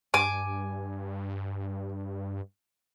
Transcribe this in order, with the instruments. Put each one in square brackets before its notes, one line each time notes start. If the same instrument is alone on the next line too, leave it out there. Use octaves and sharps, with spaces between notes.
[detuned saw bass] G2 [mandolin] G#5 D6